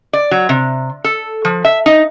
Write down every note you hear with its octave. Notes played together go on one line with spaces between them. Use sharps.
D5
F#3
C3
A4
F3
E5
D#4